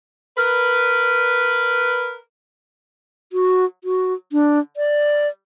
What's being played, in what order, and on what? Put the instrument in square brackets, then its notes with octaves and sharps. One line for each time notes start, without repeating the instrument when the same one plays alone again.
[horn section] A#4 B4
[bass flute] F#4
F#4
D4
D5